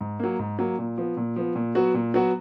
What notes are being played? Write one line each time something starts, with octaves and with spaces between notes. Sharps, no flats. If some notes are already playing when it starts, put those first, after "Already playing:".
G#2
F#3 A#3
G#2
F#3 A#3
A#2
F3 B3
A#2
F3 B3
A#2
F#3 B3 F#4
A#2
F#3 B3 F#4